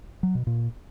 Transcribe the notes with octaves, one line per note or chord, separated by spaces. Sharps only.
F#3
B2
A#2